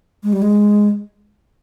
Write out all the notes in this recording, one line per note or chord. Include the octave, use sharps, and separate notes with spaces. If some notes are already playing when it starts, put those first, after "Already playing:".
G#3
G3
G#3